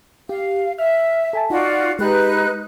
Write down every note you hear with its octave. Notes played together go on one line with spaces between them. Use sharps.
G4 F5
E5 F6
A4 G#5 A5
D#4 F4 F#4 D5
G#3 D#4 G4 B4 A#5 F#6